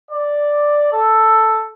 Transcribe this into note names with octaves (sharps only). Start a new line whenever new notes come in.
D5
A4